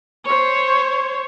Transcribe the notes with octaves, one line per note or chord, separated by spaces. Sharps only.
C5 C#5